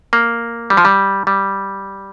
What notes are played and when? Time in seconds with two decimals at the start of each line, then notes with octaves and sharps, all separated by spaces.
0.13 A#3
0.70 G3
0.77 F3
0.85 G3
1.27 G3